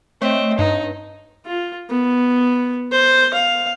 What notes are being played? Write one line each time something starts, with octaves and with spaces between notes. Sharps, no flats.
A3 C4 C#5 D#5
G2 D#4
F4
B3
C5
F5